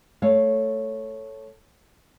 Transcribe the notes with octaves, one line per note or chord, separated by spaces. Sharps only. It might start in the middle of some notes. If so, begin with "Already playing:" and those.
A3 C#5 F5